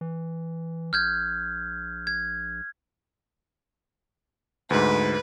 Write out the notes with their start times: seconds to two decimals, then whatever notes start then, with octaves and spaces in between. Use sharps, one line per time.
0.01 E3
0.93 A#1 F6 G6 G#6
2.07 G#6
4.70 D2 G#2 B4